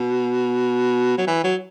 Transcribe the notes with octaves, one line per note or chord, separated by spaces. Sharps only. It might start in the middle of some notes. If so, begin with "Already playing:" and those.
Already playing: B2
F#3
E3
F#3